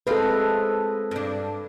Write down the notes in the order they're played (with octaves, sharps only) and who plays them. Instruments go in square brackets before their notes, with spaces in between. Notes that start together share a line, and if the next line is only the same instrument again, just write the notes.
[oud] G#3 C4 F4 [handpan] A4 B4
[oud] G2 D4